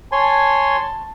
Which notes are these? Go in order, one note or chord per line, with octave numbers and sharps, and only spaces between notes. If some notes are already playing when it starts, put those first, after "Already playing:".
C#5 G#5 A5 C6